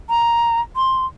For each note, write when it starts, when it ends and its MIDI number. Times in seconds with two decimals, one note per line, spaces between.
0.10 0.60 82
0.76 1.06 84